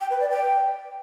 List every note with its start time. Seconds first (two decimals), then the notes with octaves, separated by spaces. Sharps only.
0.01 G5
0.10 B4
0.20 D5
0.30 G5